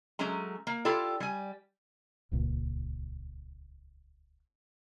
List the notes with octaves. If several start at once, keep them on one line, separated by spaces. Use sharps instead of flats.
F#3 G#3 A3 C#4 A#5
A#3
E4 F4 G4 A4 D5
G3 G#5
D#1 C#2 A#2